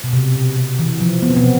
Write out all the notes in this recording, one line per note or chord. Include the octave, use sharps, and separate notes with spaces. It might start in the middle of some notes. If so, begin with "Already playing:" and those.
B2
C3
B2
C3
E3
F3
B3
C4
B2 B3
C3